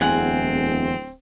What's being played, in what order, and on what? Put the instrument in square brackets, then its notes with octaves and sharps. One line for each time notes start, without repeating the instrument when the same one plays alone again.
[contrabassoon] D1 [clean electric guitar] E2 [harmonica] C4 [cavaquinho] G#4 F#5 C6